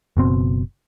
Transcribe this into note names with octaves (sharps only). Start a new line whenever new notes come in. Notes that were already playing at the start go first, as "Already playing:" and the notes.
F#1 B2 C4